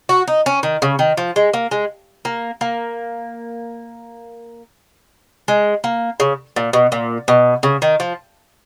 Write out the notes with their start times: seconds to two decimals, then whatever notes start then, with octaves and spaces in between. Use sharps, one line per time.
0.09 F#4
0.28 D#4
0.46 C#4
0.63 D#3
0.82 C#3
0.99 D#3
1.17 F3
1.36 G#3
1.53 A#3
1.71 G#3
2.25 A#3
2.61 A#3
5.48 G#3
5.84 A#3
6.20 C#3
6.56 A#2
6.73 B2
6.92 A#2
7.28 B2
7.63 C#3
7.82 D#3
8.00 F3